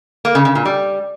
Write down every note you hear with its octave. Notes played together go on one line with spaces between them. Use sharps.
A#3
C#3
C#3
A#2
G3